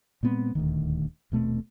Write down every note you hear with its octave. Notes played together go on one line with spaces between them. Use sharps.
A#2 G#3 B3 C4
D#1 D2 D#3
D#1 B2 A3 C4